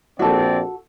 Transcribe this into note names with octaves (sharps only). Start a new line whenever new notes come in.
A#1 C4 F#4 A4 D5